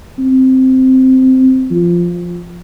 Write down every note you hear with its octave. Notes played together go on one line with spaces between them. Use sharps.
C4
F3